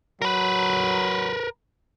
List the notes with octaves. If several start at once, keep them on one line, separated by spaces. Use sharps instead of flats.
F#3 A#4 B4